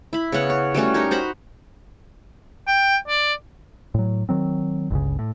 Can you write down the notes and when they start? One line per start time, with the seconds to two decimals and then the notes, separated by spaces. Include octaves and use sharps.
0.13 E4 B5
0.32 C#3 B3 C#4 F#5
0.50 C#5
0.74 G3 A3 C#4 F#4
0.94 D#4 G4 A#4 C#5
1.11 F#4 C5 A#5 B5
2.68 G5
3.08 D5
3.94 A2 F#3
4.29 D#3 F#3 C4
4.91 G1 C#2 C#3
5.19 A2